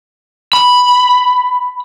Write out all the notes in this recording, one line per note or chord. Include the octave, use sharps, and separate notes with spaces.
B5